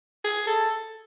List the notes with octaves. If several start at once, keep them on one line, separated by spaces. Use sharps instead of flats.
G#4
A4